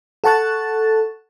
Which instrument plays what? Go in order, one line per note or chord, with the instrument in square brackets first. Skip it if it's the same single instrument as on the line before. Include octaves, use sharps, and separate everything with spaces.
[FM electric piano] A4 F#5 A5 C#6 F#6 A6